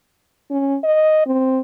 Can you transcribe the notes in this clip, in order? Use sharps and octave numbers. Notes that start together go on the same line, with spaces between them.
C#4
D#5
C4